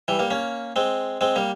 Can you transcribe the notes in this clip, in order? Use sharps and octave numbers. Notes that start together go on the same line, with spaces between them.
E3 G3
G3 A#3
A#3 C#4
G#3 C4
G#3 C4
G3 A#3